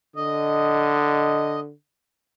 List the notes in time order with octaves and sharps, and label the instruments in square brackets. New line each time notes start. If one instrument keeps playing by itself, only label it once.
[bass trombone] D3 [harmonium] D#5